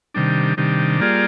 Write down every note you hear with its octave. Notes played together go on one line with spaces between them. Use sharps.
C3 D#3 G3 D4
C3 D#3 G3 D4
G3 A#3 F4 G#4 D5